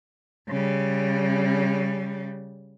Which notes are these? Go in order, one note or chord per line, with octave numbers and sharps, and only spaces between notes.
C#3 G3